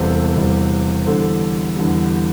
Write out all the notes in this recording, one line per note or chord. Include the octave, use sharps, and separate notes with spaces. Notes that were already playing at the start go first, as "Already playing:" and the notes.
Already playing: E1 E2 C3 G3 A4 C5
E1 E2 C3 G3
E2 D3 G3 A4 C5
E2 D3 G3